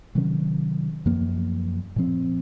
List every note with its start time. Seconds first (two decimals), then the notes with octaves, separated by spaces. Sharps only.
0.15 C3 D#3 F#3 C#4
1.06 F#2 F3 A#3
1.96 A#2 F3 C4